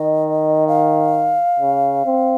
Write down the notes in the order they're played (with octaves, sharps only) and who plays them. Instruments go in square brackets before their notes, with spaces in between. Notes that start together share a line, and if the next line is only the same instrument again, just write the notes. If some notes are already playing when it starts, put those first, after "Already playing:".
Already playing: [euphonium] D#3 [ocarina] D#5
[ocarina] F5
[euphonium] C#3
C4